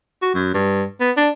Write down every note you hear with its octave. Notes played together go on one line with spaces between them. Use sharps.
F#4
F#2
G2
B3
D4